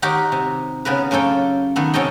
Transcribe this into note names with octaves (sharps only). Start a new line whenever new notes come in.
D#3 D#4 F#4 G4 A#4
C3
C#3 B3 A#4 B4
F#2 A#3 C#4 A4 G5
D#3 B3 A4
C3 C#4 A4 D#5 G5